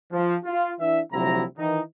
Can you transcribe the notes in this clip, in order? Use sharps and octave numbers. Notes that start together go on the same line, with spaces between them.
F3
F4
E3 D4 E4 E5
D2 C3 F3 F#3 E4 A#5
D#3 E3 D#4